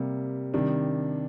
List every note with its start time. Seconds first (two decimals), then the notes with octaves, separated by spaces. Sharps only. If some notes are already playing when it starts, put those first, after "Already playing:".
Already playing: C3 G3 A#3
0.53 C3 D#3 G3 D4